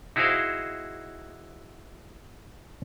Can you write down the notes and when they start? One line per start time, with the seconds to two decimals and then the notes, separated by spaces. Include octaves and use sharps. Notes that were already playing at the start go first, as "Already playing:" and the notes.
0.16 D#4 E4 F#4 G#4 C5 F5